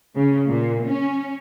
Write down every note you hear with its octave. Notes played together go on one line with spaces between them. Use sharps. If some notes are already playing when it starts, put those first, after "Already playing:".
C#3
A#2
C#4